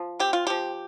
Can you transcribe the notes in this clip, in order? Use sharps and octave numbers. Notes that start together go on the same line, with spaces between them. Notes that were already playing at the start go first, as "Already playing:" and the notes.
Already playing: F3
C4 G4
F4
F3 G4